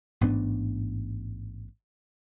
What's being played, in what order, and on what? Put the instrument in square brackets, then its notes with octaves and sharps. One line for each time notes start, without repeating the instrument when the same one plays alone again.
[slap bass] A1 G#2 B3 D4